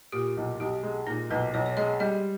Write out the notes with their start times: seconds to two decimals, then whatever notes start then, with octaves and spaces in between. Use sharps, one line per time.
0.12 A#2 G4
0.37 B1
0.60 B1 G4
0.83 G#3
1.07 A#2 D#4
1.30 B1 B4
1.54 B1 C#5
1.66 C#5
1.77 G#3 D#5
2.00 G3 D#5